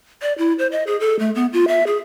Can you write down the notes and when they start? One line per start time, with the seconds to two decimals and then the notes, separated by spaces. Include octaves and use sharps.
0.22 D5
0.38 E4
0.59 C5
0.72 D#5
0.87 G#4
1.00 A4
1.19 A3
1.35 B3
1.53 F4
1.68 E5
1.87 G#4